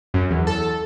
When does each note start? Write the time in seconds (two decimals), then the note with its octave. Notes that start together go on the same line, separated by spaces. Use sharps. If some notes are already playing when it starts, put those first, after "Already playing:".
0.14 F#2
0.31 E2
0.47 A4